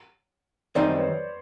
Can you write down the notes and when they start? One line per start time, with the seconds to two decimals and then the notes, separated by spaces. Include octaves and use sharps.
0.75 F#2 D#3 G3 C4 D#4 C5 D5
0.97 B4 C#5